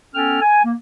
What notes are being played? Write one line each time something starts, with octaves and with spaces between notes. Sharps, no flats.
B3 C#4 A4 G5 F6
G#5
A#3